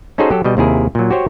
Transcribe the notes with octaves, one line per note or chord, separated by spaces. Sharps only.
C#4 D#4 F#4 G#4 A4 C5
F#3 G4 A4
B2 G3 D#5
D#2 C3 E4 G#4 A#4
A#2 F#3
F#4 G4 C5 C#5